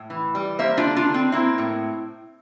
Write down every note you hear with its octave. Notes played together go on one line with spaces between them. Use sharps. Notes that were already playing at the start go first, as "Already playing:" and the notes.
Already playing: A2
E3
G3
A#3 C5 E5
D4 F4
D3
D4 F4
D3
C4
A#3 C4 E4
A2